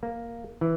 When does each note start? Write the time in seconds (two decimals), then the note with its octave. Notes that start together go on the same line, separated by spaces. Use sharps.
0.03 A#3
0.61 E3